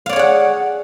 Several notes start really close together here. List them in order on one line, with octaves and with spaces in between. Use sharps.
F5 D5 C#5 G#4 F#5